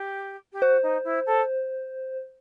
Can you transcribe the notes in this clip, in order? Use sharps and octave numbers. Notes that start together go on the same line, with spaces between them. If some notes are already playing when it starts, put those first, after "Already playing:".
Already playing: G4
G4
F#4 C5
D#4
E4
A4